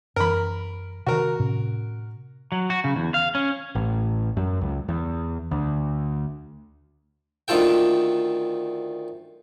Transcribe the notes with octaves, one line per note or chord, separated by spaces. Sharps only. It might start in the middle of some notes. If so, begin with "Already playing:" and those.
F#2 E3 A#4 B5
C3 D#3 F#4 A#4
A2 C3 C#4
F#3
F#4
C#3
E2
F5
C#4
A1
F#2
C#2
E2
D2
D2 D#3 F4 A4 G5